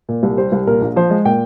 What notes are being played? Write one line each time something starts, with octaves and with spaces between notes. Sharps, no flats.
A#2
C2
G3 C5
C2
A#2 A#4
A#1
F3 C5
G#3
A#2 G5